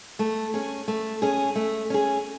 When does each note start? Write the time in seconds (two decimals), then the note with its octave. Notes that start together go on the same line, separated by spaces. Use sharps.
0.19 A3
0.54 C#4 G#4
0.88 A3
1.22 C#4 G#4
1.55 A3
1.90 C#4 G#4